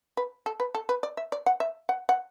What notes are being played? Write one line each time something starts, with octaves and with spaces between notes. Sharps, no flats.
B4
A4
B4
A4
B4
D5
E5
D5
F#5
E5
F#5
F#5